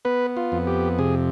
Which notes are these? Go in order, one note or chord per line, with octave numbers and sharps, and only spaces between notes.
B3 B4
F4
F2
G4
C3 G#4